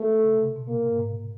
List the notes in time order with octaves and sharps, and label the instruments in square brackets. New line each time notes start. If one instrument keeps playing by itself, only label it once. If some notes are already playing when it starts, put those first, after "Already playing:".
Already playing: [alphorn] A3
[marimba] C#3
C3
C3
B2
[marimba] A#2 [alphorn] A#3
[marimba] A2
G#2
A2